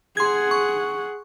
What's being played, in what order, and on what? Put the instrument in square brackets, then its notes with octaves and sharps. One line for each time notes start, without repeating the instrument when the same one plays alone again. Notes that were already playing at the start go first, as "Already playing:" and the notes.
[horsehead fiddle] G#4 F#5 [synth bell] C6 G#6
[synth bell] C#6